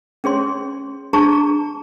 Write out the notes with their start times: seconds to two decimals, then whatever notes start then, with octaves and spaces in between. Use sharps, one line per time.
0.24 C#4 G#4 C#5 C6
1.13 D4 G#4 A5 A#5 C#6